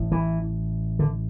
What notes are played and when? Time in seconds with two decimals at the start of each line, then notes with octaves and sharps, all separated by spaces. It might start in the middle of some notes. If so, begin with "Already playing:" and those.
Already playing: A1 A2
0.12 E3
0.99 D3